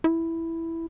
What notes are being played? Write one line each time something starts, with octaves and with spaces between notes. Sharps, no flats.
E4